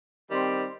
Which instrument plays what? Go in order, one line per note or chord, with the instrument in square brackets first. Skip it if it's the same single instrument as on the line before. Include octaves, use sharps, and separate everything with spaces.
[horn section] D#3 G3 C4